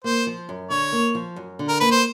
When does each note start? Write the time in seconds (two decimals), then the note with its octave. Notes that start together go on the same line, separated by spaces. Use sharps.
0.04 A#3 C5
0.27 F3
0.49 F#2
0.70 D3 C#5
0.92 A#3
1.15 F3
1.36 F#2
1.59 D3
1.68 A#4
1.80 A#3 B4
1.92 C5